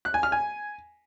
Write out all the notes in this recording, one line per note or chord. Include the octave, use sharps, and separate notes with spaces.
F#6
G#5
F6
G#5